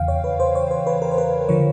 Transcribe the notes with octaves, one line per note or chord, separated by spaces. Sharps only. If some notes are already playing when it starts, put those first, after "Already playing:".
Already playing: E2 C#3 E3 F5 G5
C#5
B4
C5
C#5
C5
B4
A#4
C5
B4
D3 F3 C#5